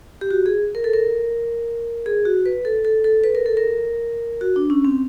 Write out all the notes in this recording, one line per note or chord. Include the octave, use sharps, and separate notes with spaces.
G4
F#4
G#4
A#4
A4
A#4
G#4
F#4
B4
A4
A4
A4
B4
A#4
A4
A#4
F#4
D4
C#4
C4